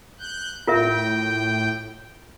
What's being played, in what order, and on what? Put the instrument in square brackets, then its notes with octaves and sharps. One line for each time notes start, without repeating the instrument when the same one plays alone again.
[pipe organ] F#6 G6
[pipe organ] A2 G5 [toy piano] F4 A#4 E5